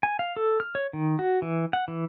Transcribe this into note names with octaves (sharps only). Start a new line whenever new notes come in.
G#5
F5
A4
F6
C#5
D#3
F#4
E3
F#5
E3